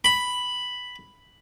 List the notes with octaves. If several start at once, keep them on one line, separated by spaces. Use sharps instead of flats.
B5